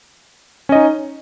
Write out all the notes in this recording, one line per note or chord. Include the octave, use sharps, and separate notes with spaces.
C#4 D#4 D#5